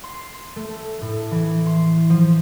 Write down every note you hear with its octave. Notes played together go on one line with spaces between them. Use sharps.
C6
A3
A2
E3
C6
F3